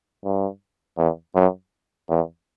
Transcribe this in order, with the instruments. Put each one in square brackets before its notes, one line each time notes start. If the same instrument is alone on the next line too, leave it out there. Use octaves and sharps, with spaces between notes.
[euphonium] G2
E2
F#2
E2